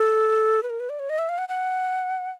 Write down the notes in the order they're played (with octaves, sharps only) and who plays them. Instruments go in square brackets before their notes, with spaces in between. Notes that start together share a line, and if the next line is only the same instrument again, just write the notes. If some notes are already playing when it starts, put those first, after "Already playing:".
Already playing: [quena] A4
B4
A#4
B4
D5
C#5
D#5
E5
F5
F#5
F#5